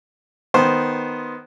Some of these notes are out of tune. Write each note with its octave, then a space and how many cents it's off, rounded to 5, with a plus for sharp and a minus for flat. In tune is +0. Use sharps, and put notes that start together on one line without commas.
D#3 +0 B3 +0 C5 +0